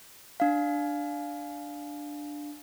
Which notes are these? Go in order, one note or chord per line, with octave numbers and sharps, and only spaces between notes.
D4 F5